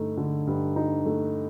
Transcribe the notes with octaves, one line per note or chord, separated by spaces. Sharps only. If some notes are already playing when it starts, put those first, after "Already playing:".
Already playing: G2 D3 A3 D#4
D3
G2
D#4
A3